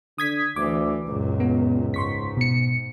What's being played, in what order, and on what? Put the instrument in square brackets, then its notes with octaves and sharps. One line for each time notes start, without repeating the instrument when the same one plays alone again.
[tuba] D3 [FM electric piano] D#6 G#6 B6
[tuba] D2 [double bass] E3 [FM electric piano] D6
[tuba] C#2 [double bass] F#2 A#2
[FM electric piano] B3
[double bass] G#2 [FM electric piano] C6 C#6 B6
[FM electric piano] B2 C#7